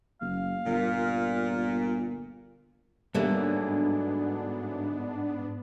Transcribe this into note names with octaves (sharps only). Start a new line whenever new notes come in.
F#1 F5
G1 A#2
G#2 D3 E3 F#3 G3 A#3 B3 D4